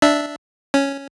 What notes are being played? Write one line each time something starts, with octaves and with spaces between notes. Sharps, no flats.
D4 E5
C#4